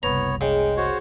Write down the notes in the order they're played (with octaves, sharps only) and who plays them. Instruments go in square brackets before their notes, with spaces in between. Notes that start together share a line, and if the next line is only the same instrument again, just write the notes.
[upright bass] F#1 C2 [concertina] B3 C#5 [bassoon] B4 [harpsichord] A#5
[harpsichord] C#3 [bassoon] G#3 [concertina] G5
[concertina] F#4 C5 C#5